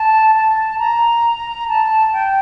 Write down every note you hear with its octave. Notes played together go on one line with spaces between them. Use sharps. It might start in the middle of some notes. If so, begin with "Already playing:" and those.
Already playing: A5
A5
A#5
A5
G5